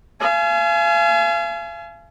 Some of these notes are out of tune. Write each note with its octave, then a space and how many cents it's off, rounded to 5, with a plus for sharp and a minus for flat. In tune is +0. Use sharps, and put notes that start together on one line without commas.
F5 -40 G#5 +30